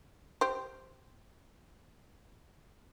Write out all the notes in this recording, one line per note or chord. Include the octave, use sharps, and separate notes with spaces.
G4 C5